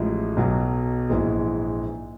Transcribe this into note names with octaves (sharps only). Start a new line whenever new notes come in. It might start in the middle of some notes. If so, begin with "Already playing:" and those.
Already playing: A1 A2 F3 G#3
B1 B2 F#3
A#1 G#2 E3 G#3